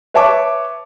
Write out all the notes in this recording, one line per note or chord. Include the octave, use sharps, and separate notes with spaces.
B4 C#5 E5 A5 C#6 D6